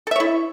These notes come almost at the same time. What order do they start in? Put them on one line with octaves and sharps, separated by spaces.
A4 E5 C#5 E4